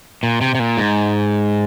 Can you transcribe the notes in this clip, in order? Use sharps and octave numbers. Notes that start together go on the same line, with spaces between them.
A#2
C3
C3
A#2
G#2